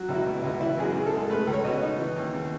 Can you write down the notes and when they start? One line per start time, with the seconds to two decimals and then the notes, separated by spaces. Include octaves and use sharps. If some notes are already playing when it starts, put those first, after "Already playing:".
Already playing: F#3 F#4
0.09 C#2 E4
0.15 F#4
0.26 B2
0.38 E4
0.44 C#2
0.61 E3 E4
0.78 F#2 G#4
0.83 F#4
0.95 C#3
1.06 A4
1.13 G#3
1.30 A3 B4
1.47 C#2
1.53 C#5
1.64 B2 D#5
1.82 D#4
1.99 E3
2.16 D#2
2.33 C#3